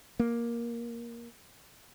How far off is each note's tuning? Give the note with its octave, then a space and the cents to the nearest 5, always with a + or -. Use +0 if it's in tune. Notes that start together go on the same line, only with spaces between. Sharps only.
A#3 +10